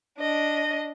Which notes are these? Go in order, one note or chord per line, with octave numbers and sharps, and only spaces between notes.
D4 D#5